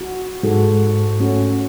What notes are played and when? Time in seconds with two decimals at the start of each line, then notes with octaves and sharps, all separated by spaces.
0.01 F#4
0.43 G#2 F#4 A4
1.20 A3 C#4 F#4